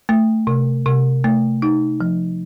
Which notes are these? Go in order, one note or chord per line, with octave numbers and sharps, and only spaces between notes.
A3
C3
C3
A3
D#4
F3